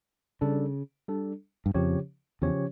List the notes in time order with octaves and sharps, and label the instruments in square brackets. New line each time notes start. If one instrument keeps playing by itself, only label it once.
[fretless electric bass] C#3 [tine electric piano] G3 D4 A4
[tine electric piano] G3 D4 A4
[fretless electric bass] G2
[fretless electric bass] F2 [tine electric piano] C#3 F3 C#4 G4 C#5
[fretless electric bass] E2 [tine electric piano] C#3 F3 C#4 G4 C#5